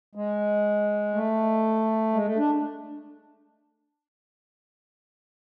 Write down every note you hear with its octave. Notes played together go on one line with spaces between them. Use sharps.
G#3
A3
G#3
A3
D4